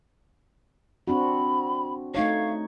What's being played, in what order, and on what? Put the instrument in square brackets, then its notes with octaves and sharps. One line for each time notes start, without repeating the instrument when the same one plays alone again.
[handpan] C4 D4 F#4 [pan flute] B5
[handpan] A3 D#4 C#5 [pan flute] F5